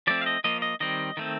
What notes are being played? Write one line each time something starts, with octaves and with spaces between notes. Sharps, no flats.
F3 A3 C4 D5
F5
D#5
F3 A#3 D#5
D#5
D#3 G3 C4 D#5
D#3 A3 C4